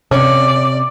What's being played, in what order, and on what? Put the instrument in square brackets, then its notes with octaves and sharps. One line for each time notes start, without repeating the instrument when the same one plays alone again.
[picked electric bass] C3 [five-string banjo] C#4 [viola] D5